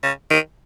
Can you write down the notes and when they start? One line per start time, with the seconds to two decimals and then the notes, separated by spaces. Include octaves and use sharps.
0.03 C#3
0.31 D#3